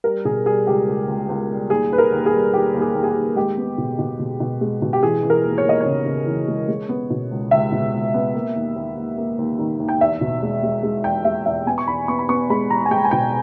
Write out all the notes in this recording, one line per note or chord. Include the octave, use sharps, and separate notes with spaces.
G3 A#4
B2 G#4
G3 G#4
C#2 G4
C#2
C#2
C#2
G3
D#2 G#4
D#2 B4
A#4
D#2
G#4
G3
D#2 G4
D#2
G#4
D#2
G#4
G4
D#2
G#3 G4
B3
B2
B2
B2
B2
G#3
B2
G4
E3 G#4
E3
A#4
D#2
C#5
D#2 D#5
C#3 C#5
C#3
E3
G#3
G#3
B3
B2
C#2
C#2 E5
B2
C#2
B3
A#3
D#2
D#2
D#2
A#3
D#2
D#3
D#2
G5
E2 E5
B2
G#3
G#3
G#3
E2 G5
G#3 E5
E2 E5
B3 G#5
C#6
E2 B5
B3 C#6
B5
B3 C#6
G#3 B5
E2 A#5
G#5
G#3 G5
G#5
B2 G5